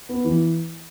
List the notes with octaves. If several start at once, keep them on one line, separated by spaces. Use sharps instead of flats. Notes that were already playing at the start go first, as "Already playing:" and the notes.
B3
E3